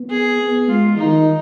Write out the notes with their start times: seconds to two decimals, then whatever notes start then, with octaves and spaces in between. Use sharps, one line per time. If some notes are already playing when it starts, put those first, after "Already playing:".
Already playing: B3
0.10 G#4
0.40 B3
0.68 G#3 F4
0.98 D#3 D#4